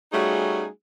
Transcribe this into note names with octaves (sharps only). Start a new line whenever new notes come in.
G3 A3 C#4 D#4 F#4 G#4